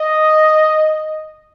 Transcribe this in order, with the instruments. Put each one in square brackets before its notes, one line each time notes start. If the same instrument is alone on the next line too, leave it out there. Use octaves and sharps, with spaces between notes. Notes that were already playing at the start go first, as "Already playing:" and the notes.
Already playing: [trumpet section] D#5